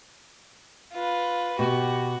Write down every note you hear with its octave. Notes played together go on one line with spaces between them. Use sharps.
F4 B4
B2 F#4 G4